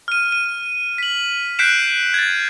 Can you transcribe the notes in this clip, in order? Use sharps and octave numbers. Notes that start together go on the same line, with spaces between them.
F6 D#7
D#7
B6 F#7
F#6 G6 B6 C7 D7 E7
G#6 A6